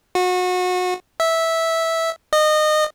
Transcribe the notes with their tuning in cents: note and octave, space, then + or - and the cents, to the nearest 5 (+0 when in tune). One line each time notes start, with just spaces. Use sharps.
F#4 -30
E5 -10
D#5 -25